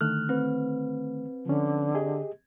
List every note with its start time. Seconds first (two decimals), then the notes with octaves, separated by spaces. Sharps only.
0.01 D3 D#3 A3 F6 F#6
0.29 C4 B4
1.46 D3 F3 C#4
1.94 G4 G#4 D#5